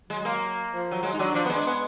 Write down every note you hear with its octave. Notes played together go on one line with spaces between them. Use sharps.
F#3 G#3
A#3
F3
F#3
F#3 G#3
D#4
F#3 D4
F3 D4
B3
G#3
D4
B3